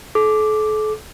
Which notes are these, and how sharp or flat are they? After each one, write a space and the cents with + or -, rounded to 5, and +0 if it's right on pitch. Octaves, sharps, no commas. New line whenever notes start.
A4 -40 D6 +0